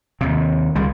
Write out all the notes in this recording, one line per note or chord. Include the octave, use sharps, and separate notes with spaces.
D#2 C3
C#2 G3 G#3